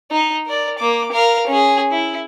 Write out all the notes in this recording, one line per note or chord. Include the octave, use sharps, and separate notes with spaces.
D#4
A#4 D5
A#3 D6
A#4 F5
C#4 G#4
E4